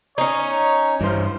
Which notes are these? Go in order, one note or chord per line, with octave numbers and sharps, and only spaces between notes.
C#4 D#4 C#5
G2 E3 C5